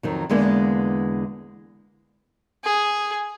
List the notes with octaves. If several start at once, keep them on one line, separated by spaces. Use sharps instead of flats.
F2 D#3 F#3
E2 D3 G#3 A#3 B3 D4
G#4